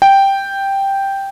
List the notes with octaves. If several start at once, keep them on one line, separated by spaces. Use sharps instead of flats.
G5